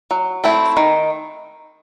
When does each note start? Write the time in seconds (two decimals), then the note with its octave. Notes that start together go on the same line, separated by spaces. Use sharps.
0.11 F#3
0.44 A3 C4 E4
0.77 D#3